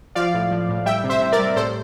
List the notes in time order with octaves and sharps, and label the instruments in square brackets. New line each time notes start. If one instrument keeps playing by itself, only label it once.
[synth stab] F3 D5 F5
A2
F3
A2
G3 E5 G5
C3
C5 E5
C3
A#4 D5
G3
A2 A4 C5